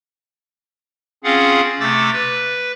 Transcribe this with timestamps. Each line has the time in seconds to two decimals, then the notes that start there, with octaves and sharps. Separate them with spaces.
1.24 C4 C#4 F4 G#4 F5 F#5
1.80 C3 A3 D6 E6 A6
2.13 B4